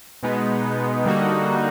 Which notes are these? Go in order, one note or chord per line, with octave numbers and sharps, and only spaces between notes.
B2 G#3 B3 D#4
D3 G3 A#3 D#4 F#4